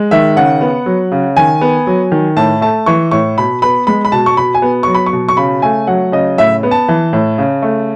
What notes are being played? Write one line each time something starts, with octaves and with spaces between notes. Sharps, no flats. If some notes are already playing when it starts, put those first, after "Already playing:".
Already playing: G#3
D#3 E5
C#3 F#5
B3
F#3
C#3
D#3 G#5
B3
F#3
D#3
A2 A5
A3 A5
E3 C#6
A2 C#6
B2 B5
B3 B5
G#3 B5
B5
B2 A5
C#6
B2 B5
G#5
B3
F#3 C#6
B5
C#6
B2
C#6
C#3 B5
A3 G#5
F#3 F#5
C#3 D#5
A2 E5
B3
A5
E3
A2
C#3
A3